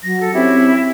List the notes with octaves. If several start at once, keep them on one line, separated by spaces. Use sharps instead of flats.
F#3 A#6
A4
C4 C#4 E4 G4